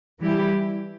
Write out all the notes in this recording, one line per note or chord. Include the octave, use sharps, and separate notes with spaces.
E3 G3 E4 G4